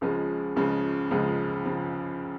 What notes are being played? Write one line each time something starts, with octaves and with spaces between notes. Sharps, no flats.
C#2 C#3 F3 G#3
C#2 C#3 F3 G#3
C#2 C#3 F3 G#3
C#3 F3 G#3